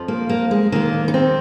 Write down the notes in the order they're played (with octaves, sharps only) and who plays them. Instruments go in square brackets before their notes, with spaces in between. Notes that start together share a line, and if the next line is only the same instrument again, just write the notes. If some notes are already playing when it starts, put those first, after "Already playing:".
Already playing: [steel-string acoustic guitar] F2 F3
A#3
A#3
G#3
D#2 D#3 A#3
D#4
C4